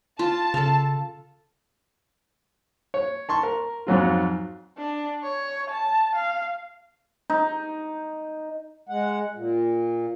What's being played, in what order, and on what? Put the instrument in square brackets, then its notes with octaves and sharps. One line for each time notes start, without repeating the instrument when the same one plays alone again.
[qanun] F4 [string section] A5
[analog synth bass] C#3 [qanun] A4 F5
[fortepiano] C#5
A5 C6 C#6
A#4
F2 G#2 F#3 F4
[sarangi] D4
C#5
A5
F5
[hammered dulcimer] D#4
[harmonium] G#3 F#5
A#2